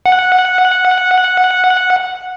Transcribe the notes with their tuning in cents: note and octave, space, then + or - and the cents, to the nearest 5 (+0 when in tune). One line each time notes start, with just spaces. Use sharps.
F#5 -10